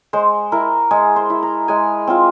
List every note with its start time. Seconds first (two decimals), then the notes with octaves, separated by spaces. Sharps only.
0.13 G#3 C5
0.52 E4 A#4
0.91 G#3 G#4
1.16 C5
1.30 E4
1.43 A#5
1.68 G#3 G#5
2.07 C4 F4